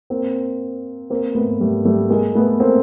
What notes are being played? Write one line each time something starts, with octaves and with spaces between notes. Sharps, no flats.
A#3 C4
A#3 C4
A3 B3
G3 A3
G3 A3
G#3 A#3
A3 B3
A#3 C4